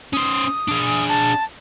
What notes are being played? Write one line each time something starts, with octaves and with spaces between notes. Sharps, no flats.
C#4 C5 D#6
D4 G#4
A5